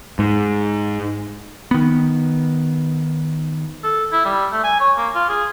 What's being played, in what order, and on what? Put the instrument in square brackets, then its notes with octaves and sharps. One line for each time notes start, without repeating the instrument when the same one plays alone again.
[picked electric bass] G#2
D#3 B3
[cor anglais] A4
E4
G3
A3
G#5
C#5
A#3
F4
G#4